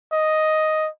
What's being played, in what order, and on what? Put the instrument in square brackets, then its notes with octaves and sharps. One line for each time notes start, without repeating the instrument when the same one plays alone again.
[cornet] D#5